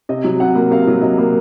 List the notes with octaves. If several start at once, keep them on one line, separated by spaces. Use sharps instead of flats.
C3 D#5
F#3
C3 F#5
A#3
C3 F5
F#3
C3 D#5
A#3